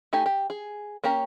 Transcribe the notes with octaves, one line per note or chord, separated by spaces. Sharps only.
A3 D#4 G4 G#5
G4
G#4
A#3 C#4 G4 A#5